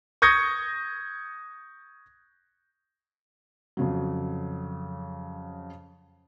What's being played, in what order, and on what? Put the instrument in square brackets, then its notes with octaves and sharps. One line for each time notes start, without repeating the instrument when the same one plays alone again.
[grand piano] C#6 D#6 G6 G#6 A#6 C#7
[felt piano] F2 C#3 F#3